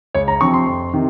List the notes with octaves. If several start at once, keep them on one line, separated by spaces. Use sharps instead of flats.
C#2 C#5
A#5
C3 F3 C4 C#6
C6
F2
C3 D#3